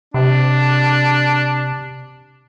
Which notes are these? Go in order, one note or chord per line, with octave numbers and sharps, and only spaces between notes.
C3 D4